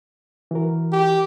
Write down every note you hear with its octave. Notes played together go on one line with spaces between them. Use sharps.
E3 F#4 A#4
G4